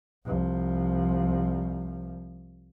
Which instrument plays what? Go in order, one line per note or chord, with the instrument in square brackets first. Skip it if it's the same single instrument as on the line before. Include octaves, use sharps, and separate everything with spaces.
[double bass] C2 F3